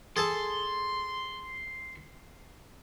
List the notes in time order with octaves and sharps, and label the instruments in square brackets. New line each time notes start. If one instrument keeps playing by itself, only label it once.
[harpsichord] G#4 A4 A5 [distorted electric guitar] C6